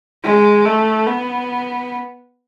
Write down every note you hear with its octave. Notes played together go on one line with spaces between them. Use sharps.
G#3
A3
B3